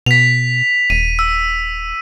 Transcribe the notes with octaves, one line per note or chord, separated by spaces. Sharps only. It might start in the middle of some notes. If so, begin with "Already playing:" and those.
B2 B6 F7
D#1 D#7
E6